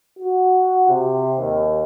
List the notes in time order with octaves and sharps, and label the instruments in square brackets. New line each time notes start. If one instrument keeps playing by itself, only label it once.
[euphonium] F#4
C3
D#2